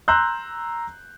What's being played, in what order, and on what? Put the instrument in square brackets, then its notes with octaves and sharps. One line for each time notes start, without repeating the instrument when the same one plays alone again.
[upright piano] A#5 C6 E6 F#6 G6